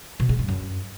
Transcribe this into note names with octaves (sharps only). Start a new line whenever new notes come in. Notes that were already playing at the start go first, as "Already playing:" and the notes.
B2
G#3
G2
F#2